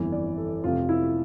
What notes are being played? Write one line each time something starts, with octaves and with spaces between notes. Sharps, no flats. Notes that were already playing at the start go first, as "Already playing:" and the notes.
Already playing: G1 F2 E3
D5
A4
F1 F2 C3 F4
E4